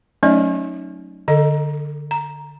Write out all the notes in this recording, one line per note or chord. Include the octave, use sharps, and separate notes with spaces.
F#3 A3 C#4 D#4 D5 D#5
D3 A4 D#5
A#5